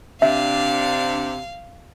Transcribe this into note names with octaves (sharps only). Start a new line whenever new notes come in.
C3 D4 E5 F5